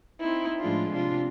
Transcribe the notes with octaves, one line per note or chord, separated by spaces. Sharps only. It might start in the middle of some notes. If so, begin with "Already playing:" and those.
C4 D#4 E4
A2 F3 G#3 D4 F4
C3 D4 F4